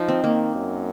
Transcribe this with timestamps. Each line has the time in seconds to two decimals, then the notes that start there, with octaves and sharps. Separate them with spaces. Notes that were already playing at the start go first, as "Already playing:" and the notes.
Already playing: F3 D#4
0.08 C4
0.23 D#3 A#3
0.55 F#2